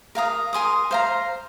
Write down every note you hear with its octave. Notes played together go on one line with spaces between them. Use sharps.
A#4 F5 A#5 D#6
A#4 G#5 C6 D#6
C5 F5 A#5